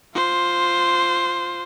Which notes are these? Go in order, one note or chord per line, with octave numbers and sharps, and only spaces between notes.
F4 C5